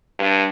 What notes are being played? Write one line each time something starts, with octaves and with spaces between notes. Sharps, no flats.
G2